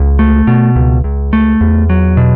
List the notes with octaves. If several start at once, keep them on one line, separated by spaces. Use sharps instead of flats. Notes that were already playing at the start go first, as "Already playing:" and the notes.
Already playing: C#2
A3
B2
C#2
C#2
A3
E2
F#3
B2